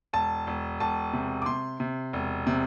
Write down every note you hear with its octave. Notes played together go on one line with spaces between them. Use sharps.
E1 A5
E1
E1 A5
C3
D6
C3 C6
C3
E1
C3